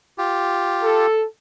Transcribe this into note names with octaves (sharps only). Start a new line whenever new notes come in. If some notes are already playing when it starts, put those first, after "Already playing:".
F4 G4
A4